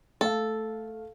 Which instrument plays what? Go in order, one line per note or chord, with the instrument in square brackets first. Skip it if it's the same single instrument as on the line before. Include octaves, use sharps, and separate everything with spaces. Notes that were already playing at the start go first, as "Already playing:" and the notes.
[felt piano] A3 F5 [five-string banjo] A4